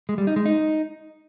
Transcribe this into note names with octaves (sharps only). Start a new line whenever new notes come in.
G#3
G3
D#4
G#3
D#4